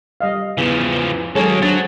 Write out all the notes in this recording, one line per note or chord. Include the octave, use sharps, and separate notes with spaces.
G3 D#5 F5
E2 C#3 E3 F3
D#2 F#3 G#3 A#3 C#4 G#4 A4 C#5
F#3 D4 C5 F#5 A6